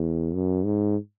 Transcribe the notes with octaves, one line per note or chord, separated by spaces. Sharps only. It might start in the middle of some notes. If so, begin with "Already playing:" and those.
Already playing: E2
F#2
G#2